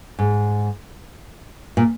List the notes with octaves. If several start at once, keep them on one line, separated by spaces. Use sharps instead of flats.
G#2
A#2